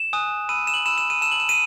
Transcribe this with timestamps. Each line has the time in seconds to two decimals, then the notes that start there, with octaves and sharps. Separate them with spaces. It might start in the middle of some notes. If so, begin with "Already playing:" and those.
Already playing: E7
0.13 G#5 D#6 F#6
0.49 B5 E6 D#7
0.67 E7
0.74 F#7
0.86 B5 E6 E7
0.98 E7
1.10 D#7
1.21 A5 E6 E7
1.31 F#7
1.40 E7
1.49 D#7